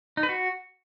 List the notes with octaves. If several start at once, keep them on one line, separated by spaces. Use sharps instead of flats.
D#4
B4
F#4